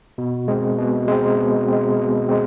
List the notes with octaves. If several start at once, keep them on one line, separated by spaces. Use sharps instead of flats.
B2
G#3 C4
B2
G#3 C4
B2
G#3 C4
B2
G#3 C4